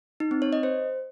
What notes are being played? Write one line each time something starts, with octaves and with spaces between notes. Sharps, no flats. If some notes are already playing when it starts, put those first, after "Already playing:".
D#4
C4
C#5
D#5
C5